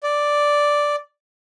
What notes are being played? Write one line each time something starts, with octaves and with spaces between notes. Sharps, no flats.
D5